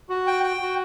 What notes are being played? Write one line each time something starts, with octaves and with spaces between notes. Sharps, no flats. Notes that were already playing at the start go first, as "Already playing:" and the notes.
F#4
G5
G5
F#4